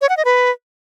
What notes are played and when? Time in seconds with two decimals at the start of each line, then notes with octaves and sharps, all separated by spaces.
0.01 C#5
0.09 F#5
0.17 D#5
0.25 B4